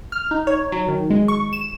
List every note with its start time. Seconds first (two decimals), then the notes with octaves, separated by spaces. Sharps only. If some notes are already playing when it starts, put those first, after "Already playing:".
0.12 F6
0.31 D#4
0.47 C#5
0.72 F#3
0.88 D#3
1.10 G#3
1.28 C#6
1.53 E7